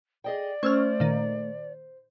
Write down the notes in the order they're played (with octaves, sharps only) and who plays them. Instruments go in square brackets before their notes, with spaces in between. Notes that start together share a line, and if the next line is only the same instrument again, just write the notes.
[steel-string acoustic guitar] G#4 D#5 G5 [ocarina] D5
[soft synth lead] A3 [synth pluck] C#4 E6 F6 [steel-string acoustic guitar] C5
[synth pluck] A#2 D#3